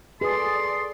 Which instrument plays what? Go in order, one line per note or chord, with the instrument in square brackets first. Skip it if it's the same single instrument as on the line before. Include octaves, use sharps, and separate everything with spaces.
[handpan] G#4 [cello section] A4 D5 [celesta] B4 D#6 [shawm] C6